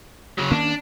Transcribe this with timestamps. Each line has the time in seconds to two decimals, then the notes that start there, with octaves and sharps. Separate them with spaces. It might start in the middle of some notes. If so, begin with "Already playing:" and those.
0.38 C#3 F#3
0.51 D#3 A#3 C#4 D4